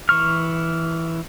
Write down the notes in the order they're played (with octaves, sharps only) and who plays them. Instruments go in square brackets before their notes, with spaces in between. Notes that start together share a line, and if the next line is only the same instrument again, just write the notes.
[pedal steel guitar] E3 C#6 F6